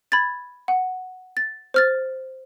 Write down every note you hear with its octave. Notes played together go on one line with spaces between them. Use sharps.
B5 G#6 A6
F#5
A6
C5 F6 A6